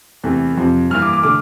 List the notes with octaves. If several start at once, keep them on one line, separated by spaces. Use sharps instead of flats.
E2 C3 E3 A3
F2 C3 F3
G2 E3 A#3 F6
D6
D6
D3 A3 D6